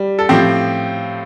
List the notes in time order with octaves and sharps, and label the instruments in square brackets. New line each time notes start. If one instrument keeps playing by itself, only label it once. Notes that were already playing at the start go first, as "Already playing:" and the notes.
Already playing: [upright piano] G3
A4
A2 F3 C4 G4